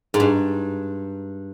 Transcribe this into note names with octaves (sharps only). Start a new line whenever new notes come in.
G#2
G2